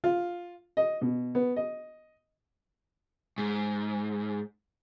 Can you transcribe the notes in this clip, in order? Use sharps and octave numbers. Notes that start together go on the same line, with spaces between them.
F4
D#5
B2
B3
D#5
G#2